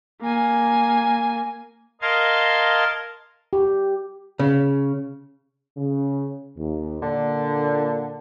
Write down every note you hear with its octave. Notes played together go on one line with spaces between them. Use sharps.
A#3 G#5
A#4 D#5 F5 A5 C6 G#6
G4
C#3
C#3
D#2
A#2 D3 A#3